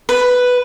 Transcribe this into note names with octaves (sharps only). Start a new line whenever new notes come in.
B4